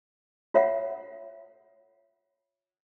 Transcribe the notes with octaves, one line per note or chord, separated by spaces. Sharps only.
F4 C#5 E5 F#5